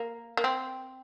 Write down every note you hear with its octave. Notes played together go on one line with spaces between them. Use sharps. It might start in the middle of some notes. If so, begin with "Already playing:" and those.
Already playing: A#3
A#3
C4